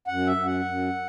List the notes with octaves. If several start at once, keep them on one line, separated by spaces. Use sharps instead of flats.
F#2 F#5
E5
F#2
F#5
F#2